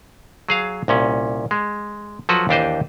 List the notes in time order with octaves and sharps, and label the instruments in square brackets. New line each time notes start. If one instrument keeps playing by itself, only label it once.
[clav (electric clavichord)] F#3 G#4 F5
C2 A#2 C#4
G#3
F3 F#3 F#4 A4 B4
D#2 E3 D4 G4 C5 D#5